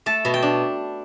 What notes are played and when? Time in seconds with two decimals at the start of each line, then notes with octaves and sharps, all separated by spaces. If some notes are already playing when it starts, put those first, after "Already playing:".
0.06 A3 A5
0.25 B2
0.34 G5
0.42 D4